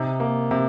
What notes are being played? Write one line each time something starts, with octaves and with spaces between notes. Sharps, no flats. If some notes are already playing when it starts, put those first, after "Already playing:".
Already playing: C3 D#4
A#3
C3